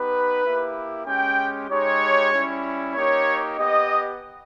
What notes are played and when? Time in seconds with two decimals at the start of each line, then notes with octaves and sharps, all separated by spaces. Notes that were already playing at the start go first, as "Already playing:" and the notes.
Already playing: B3 D#4 G4 B4
0.43 A#3 E4 G4
1.05 G#3 C#4 G4 G5
1.68 G#3 D#4 G4 C#5
2.31 G3 C#4 E4
2.95 A#3 D#4 G4 C#5
3.57 B3 G4 D#5